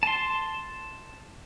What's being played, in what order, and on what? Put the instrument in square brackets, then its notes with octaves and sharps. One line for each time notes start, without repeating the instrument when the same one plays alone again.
[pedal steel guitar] A5 C6